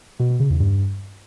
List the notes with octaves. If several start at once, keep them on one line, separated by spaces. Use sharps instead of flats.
B2
B2
C#3
E2
G2